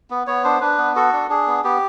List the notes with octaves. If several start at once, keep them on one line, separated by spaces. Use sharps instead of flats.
B3
B3 C#5
D4 C5
D4 B4
B3
F#4 A4
D4
D4 G#4
B3
B3 G4